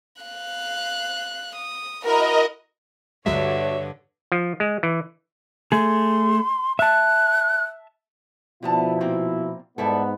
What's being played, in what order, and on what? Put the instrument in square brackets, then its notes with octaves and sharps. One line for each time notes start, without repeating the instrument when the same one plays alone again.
[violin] F5 F#6
D#6
[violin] E4 F#4 [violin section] A#4 [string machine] D#5
[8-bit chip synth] D2 F#3 G#3 [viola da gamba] G2 D3 [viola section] F#4 C#5 [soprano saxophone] E5
[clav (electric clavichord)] F3
G#3
E3
[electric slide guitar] A3 G#4 [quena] C6
[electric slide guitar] E5 A5 [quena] F#6
[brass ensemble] B2 F3 E4 [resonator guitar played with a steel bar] D3 B3 A5
[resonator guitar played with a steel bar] A#2 A#3 C4
[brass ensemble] G#2 B3 [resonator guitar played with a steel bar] G3 E4 A4